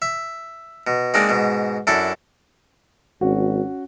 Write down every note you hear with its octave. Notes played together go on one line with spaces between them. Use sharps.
E5
B2
G#3 A#3 C4 D4 D#4
G#2 B2
F#2 D4 E4 A4
G#1 C#4 F#4